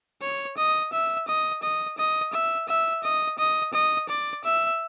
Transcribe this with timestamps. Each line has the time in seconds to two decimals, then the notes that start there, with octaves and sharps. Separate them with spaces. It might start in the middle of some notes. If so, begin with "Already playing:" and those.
0.22 C#5
0.58 D#5
0.93 E5
1.28 D#5
1.63 D#5
1.98 D#5
2.33 E5
2.69 E5
3.04 D#5
3.39 D#5
3.73 D#5
4.09 D5
4.45 E5